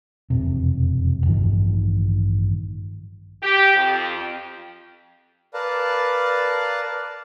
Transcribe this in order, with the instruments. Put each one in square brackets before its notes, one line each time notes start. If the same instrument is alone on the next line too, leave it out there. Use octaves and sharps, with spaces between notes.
[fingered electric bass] E1 F2 C3
A1 G2 D#3 F3
[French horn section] G4
F2
[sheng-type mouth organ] A#4 B4 D5 F5 A5